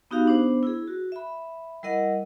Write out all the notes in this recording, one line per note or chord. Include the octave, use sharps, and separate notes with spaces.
B3 D#4 F#4 G4 F5
B3 D4 C5
E4 G#4
F#4
E5 B5
G3 E4 A#4 D#5 F#5